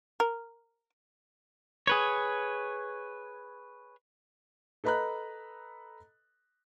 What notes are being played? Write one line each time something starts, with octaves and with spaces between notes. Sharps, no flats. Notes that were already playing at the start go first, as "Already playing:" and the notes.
A#4
G#4 B4 C#5
A4 B4 D#5 A#5 B5 F#6